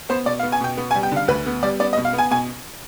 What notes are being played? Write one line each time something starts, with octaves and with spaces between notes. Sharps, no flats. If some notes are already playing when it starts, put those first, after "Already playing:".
B3 C5
B2 D5
F5
B3
G#5
B2 G5
B3
G#5
G3
G5
D3 F5
D2 B4
B3
G3 D5
B3 D5
D#5
B2
F5
B3
G#5
B2 G#5